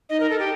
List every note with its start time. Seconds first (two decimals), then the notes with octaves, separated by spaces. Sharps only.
0.09 D#4 D#5
0.20 A#4
0.30 A4
0.39 G4